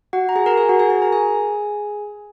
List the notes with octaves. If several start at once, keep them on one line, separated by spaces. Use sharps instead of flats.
F#4 F#5
A#5
G#4 G#5
A#4 A#5
G#4 G#5
F#4 F#5
G#4 G#5
G#4 G#5
A#4 A#5
G#4 G#5